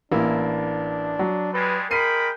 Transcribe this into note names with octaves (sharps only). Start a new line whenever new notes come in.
A1 A#3 D4 E4
F#3
G3 G#3 B4
G#3 A#4 G5 B5 C7 D#7